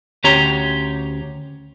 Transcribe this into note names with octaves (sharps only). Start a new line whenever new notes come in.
D2 C#4 G4 C#5 A#5 C6